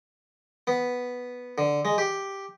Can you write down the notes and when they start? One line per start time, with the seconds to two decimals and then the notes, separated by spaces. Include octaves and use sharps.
0.67 B3
1.58 D3
1.85 G#3
1.98 G4